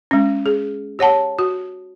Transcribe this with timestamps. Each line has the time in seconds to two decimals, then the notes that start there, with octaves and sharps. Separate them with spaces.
0.11 G#3 C#4
0.46 G#4
0.99 G4 C#5 F#5 A5
1.39 F#4